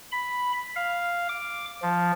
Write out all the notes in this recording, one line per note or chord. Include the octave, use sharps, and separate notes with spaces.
B5
F5
D6
F3